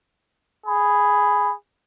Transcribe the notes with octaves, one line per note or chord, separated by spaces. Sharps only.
G#4 B5